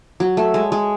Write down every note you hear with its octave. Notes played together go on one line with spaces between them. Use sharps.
F#3
A3
G#3
G#3